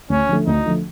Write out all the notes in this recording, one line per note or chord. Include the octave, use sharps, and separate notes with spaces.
D2 C#4
D3 F3 A3
D2 D#4
D3 F3 A3